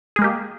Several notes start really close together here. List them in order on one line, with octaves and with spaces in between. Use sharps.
G#4 G#3 A#3 G4